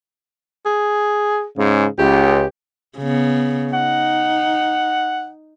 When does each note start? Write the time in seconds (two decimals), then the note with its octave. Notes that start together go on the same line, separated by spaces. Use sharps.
0.66 G#4
1.56 G#2 C#3
1.99 C#2 G4
2.98 C#3 B3
3.73 D#4 F#5